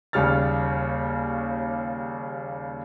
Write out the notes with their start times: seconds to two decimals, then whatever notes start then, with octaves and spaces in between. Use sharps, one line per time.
0.13 D#2 C#3 G3 C#5 F6 A6